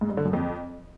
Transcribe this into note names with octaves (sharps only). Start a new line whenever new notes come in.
G#2
G2
D3
F#2
F2